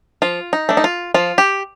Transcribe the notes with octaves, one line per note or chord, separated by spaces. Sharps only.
F3 F4
D#4
A3 D4
D#4
F4
F3 F4
G4